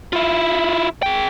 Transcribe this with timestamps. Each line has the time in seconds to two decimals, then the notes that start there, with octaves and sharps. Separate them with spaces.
0.13 E4 F4
1.02 G#4 G5